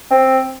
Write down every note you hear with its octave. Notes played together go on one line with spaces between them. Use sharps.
C4